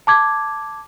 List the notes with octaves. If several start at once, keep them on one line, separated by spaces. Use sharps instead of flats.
A5 D6 G#6